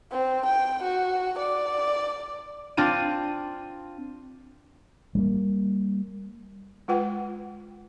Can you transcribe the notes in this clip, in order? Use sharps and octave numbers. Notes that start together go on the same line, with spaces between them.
C4
G5
F#4
D5
C4 D4 F4 D#7
G3 G#3 A#3
G#3 F4 B4 F#5 G5